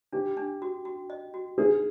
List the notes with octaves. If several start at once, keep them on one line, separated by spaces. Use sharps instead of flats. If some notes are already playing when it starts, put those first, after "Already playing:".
D4 G4
D4
F#4
F#4
D#5
F#4
D4 G#4